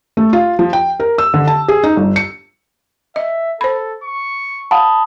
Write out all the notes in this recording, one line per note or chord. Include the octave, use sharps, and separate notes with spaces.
A3
F4
F3
G5
A#4
E6
D3
A5
G#4
D#4
G1
C#7
D#5 E5
A4 C5 B5
C#6
F5 F#5 A5 B5 D#6